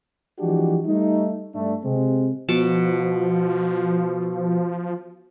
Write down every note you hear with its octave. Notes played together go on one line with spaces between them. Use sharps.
E3 F3 G#3 D4 F#4 G4
G3 A3 D#4
G2 A3 D4
C3 G#3 C4
B2 F3 A5